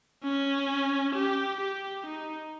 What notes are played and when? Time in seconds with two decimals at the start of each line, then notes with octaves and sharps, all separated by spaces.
0.24 C#4
1.16 G4
1.61 G4
2.07 D#4